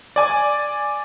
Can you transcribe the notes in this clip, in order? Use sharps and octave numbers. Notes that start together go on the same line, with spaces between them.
D5 G#5 D6